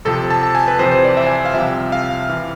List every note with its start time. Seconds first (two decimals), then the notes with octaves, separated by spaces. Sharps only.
0.05 F2 C3 F3 A4
0.30 A5
0.43 A5
0.55 G#5
0.68 B4
0.79 F2 C3 E3 C5
0.92 C5
1.05 D5
1.17 E5
1.27 G#5
1.45 F5
1.54 C2 C3 F3 E5
1.92 F5
2.29 E3